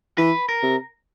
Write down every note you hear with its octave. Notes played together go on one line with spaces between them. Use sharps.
E3 B4
A#4
C3